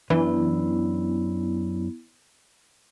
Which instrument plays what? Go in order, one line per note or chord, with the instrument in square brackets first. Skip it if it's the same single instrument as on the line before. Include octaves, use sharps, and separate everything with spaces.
[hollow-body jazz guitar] F#2 D4 B4 [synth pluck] E3 [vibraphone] B3 E4